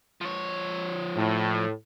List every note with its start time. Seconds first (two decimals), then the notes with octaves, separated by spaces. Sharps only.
0.21 F3 C#5
1.17 A2